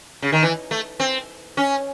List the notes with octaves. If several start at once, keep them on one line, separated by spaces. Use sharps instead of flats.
C#3
D#3
E3
A3
C4
C#4